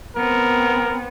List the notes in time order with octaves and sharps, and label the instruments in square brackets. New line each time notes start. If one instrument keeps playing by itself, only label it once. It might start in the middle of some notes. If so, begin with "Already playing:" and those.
[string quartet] B3 C4 [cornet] A#4